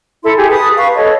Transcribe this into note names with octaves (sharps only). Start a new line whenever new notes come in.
E4 A4 C6
G4 G#4
B4 A5 D#6
B4 F5 C#6
A4 C#5 D#5